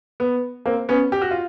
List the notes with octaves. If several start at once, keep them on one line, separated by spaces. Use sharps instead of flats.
B3
A#3 C4
B3 C#4
G4
F#4
F4